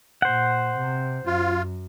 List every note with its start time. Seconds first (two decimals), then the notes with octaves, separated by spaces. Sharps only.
0.22 A#2 C5 F#5
0.77 C3
1.26 F#2 F4